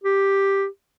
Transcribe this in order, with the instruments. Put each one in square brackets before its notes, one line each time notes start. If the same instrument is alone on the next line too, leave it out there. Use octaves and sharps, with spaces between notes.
[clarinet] G4